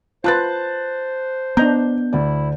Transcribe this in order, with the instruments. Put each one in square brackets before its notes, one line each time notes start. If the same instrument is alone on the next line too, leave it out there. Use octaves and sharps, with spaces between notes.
[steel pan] F4 B4 [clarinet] C5 [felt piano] A5 F#6 A6
[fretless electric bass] B3 [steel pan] D4 D#5 A#5 [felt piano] G6
[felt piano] D2 D5 [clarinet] E4